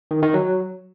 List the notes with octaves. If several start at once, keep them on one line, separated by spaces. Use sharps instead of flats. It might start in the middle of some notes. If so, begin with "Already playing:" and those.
D#3
D#3
F#3